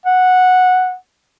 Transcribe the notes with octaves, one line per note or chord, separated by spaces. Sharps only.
F#5